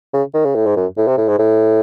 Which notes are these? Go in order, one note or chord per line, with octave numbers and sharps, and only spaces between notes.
C#3
D#3
C#3
A2
G#2
F#2
A2
C3
A2
G#2
A2